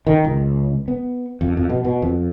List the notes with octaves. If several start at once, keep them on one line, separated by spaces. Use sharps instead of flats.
D#3
C#2
B3
F2
F2
B2
B2
F2